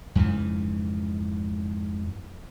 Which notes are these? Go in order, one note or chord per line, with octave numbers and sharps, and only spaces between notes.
F2 G#2 C#3 E3